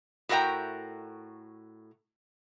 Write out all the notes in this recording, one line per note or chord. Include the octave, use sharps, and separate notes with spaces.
A2 F#4 A#4 E5 G5 A#5